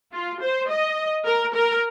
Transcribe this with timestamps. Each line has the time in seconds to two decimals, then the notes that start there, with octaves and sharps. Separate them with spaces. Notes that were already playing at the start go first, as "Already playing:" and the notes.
0.13 F4
0.42 C5
0.70 D#5
1.26 A#4
1.55 A#4